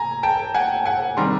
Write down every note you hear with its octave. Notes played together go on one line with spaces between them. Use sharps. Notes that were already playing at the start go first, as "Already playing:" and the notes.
Already playing: G#5 A#5
G5 A5
F#5 G#5
F#5 G#5
D#3 G3 C4 A#5 C6